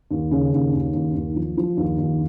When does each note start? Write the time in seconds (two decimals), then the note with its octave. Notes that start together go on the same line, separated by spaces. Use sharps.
0.11 D#2
0.31 C#3
0.53 D#2
0.73 D#2
0.93 D#2
1.14 D#2
1.36 F3
1.57 F3
1.77 D#2
1.98 D#2